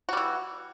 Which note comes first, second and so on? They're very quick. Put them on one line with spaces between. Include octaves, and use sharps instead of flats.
F#4 G3 E3